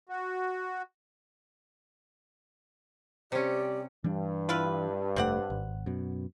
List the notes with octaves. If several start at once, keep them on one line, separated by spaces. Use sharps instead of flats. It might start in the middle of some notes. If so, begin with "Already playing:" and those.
F#4
C3 G3 C#4 G4 D5
G2 E3 G3 D4
E4 F4 B4
F1 A3 C4 D5 F#5
G#1
F#2 B2